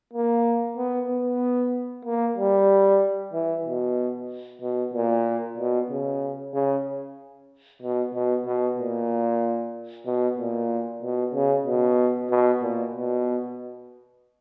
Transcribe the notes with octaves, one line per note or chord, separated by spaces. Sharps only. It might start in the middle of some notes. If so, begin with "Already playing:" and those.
A#3
B3
B3
A#3
G3
E3
B2
B2
A#2
B2
C#3
C#3
B2
B2
B2
A#2
B2
A#2
B2
C#3
B2
B2
A#2
B2